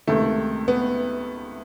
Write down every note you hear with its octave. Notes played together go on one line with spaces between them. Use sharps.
C#2 C3 D#3 A3
B3